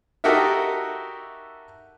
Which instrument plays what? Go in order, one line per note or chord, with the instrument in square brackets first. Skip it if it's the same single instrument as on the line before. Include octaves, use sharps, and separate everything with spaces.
[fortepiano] D#4 F#4 G4 A4 A#4 E5